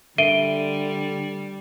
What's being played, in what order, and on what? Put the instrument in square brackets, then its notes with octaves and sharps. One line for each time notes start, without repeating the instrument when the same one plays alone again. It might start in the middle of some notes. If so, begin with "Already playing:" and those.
[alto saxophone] D3 [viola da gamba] G3 [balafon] E5 [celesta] D7 D#7 G7